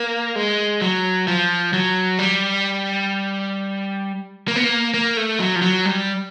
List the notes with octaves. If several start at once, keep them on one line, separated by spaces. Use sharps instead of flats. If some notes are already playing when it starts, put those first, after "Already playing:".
Already playing: A#3
G#3
F#3
F3
F#3
G3
A#3
B3
A#3
A#3
A3
F#3
F3
F#3
G3